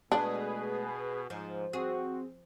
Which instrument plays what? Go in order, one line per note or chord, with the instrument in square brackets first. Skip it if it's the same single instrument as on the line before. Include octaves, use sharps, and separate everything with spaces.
[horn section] B2 [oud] G#3 A3 [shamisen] D4 [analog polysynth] G#4 B4
[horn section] G#2 [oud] F3
[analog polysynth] C4 [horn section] F#4 [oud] G#4